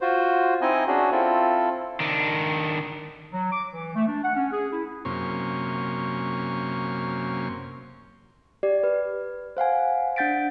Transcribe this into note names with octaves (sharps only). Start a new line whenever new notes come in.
F4 F#4 C5
C4 D#4 E4 D#5 G#5
C#4 D4 F#4 G#4
C4 E4 F4 A4
D#3 D4
F#3
D6
E3
A3
D4
F#5
C#4
G#4
E4
F#2 C3 A#3 C#4 C6 C#6
G4 D5
B4
C5 F5 F#5 G#5
D4 F#5 G6 A6 B6 D7